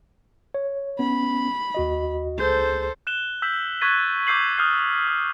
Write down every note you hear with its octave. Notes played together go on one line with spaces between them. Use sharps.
C#5
B3 C#4 B5
D#2 F#4 D#5
C#2 G#4 A4 C5 G6
F#6 E7 G7
E6 G6 B6 E7 F#7
C#6 F#6 G#6 A6 B6 D#7
D6 E6 G6 C7 F#7
D#6 F6 G6 C7
D#6